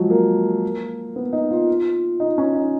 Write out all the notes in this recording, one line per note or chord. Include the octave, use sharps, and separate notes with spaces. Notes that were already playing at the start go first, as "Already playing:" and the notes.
Already playing: F3 F#3 G#3
A#3
B3
D#4
F4
D#4
C#4
D#4